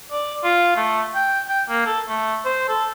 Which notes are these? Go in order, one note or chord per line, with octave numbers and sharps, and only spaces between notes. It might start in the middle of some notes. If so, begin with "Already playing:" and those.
D5
F4
A3
G5
G5
A#3
A4
A3
C5
A4